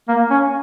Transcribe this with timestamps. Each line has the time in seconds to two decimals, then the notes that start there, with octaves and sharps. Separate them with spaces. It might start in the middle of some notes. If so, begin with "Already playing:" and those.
0.08 A#3
0.30 C#4